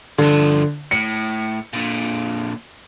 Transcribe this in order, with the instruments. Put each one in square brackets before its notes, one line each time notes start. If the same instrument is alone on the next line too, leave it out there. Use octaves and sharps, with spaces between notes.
[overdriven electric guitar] G2 F3 [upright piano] D3
[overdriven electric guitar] A2 [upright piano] C#7
[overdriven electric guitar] A#2 D3